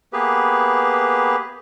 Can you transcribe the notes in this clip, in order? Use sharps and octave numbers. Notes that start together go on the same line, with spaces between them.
A#3 B3 G4 G#4 B4